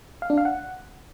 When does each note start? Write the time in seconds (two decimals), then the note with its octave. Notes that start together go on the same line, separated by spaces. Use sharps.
0.22 F5
0.30 D4
0.38 F5
0.45 F#5